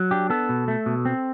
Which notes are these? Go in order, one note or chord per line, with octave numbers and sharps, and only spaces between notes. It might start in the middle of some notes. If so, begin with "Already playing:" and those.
Already playing: F#3
D4 G4
B3 A4
B2
A3
B2
C4